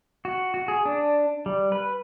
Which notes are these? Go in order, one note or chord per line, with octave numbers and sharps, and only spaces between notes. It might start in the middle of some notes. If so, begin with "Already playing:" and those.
F#4
F#4
G#4
D4
G3
B4